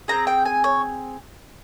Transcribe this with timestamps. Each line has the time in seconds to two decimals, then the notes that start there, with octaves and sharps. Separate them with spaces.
0.08 C4 F4 G#4 A#5
0.27 G5
0.45 G#5
0.64 C#5